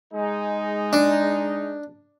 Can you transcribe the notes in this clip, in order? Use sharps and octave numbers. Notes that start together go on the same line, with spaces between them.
G#3 D#4
D4